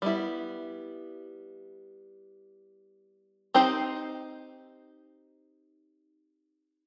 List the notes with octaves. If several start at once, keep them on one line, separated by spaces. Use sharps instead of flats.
G3 B3 E4
C4 D#4 G4 C5